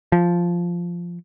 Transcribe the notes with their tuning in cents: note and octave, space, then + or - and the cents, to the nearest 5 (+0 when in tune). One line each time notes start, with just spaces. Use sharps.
F3 -5